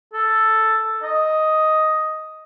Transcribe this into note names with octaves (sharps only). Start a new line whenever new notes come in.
A4
D#5